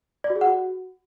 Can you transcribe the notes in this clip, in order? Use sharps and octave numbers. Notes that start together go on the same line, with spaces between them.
D5
F#4
G#4
F#5
F#4